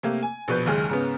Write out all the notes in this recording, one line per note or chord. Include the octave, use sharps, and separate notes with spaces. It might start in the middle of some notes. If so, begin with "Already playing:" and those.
C3 A3 A#3
G#5
A#1 B2 B4 G6
F#1 D#2 G#3 F6
G#2 C#3 B3